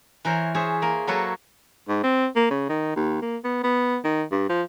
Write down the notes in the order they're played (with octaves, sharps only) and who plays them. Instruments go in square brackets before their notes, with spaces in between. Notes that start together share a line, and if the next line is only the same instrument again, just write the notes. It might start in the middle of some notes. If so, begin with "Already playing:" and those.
[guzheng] E3 A#4 C5 C#5
G#4 C5 C#5 E5
A#3 A#4
F#3 A#3 A4 B4 C#5
[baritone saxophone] G#2
C4
A#3
C#3
D#3
D#2
A#3
B3
B3
D#3
G2
F3